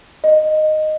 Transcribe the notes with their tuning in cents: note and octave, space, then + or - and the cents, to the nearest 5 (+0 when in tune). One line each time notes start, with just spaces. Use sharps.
D#5 -10